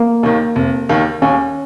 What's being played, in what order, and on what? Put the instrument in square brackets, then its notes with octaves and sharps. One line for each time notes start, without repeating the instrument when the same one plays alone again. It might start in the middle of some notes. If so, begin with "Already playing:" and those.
Already playing: [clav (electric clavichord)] A#3
[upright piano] D#2 D#3
F1
D#2 D#3
[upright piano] D#2 [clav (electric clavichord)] C#4